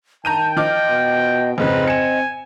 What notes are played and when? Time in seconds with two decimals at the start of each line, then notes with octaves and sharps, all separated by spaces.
0.25 D#3 G5 A5 A#5 G6 D#7
0.57 F3 D#5 D6 F6
0.90 B2
1.58 F2 G#2 C#3 C4 B4 D#5
1.87 G#5 C#7 E7